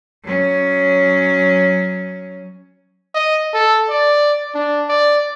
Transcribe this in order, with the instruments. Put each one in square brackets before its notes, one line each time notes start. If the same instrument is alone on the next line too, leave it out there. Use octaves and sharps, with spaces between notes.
[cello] F#3 C#4
[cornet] D#5
A4
D5
D4
D5